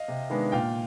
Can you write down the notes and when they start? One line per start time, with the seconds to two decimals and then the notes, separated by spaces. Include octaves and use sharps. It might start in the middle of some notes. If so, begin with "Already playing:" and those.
Already playing: D#5 F5
0.08 C3
0.30 D#3 G#3 B3 D4
0.52 A#2 F5 G5